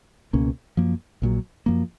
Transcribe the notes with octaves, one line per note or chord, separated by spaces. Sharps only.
C#2 B2 A#3 C#4
F#2 F3 A#3
A#1 A#2 F#3
F#2 F3 A#3